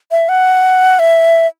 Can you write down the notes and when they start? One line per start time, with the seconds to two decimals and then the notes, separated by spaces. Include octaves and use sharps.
0.11 E5
0.29 F#5
0.99 E5